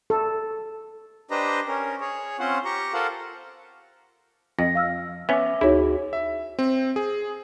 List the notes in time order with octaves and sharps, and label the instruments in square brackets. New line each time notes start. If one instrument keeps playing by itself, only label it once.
[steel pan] A4
[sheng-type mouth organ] D4 G4 B4 C5 D#5 A#5
C#4 A#4
G#4 C#5
C4 C#4 F4 C5 F#5
G4 A#5 C#6
F4 A4 A#4 C5 F5 F#5
[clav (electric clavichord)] F2 [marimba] D#5 [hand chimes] A#6
[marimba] F5 E6 F6
[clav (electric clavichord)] B3 C#4 [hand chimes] E5 D6
[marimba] D2 D#4 C#5 [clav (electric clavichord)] E4 [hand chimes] F#4 G#4
[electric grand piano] E5
C4
G#4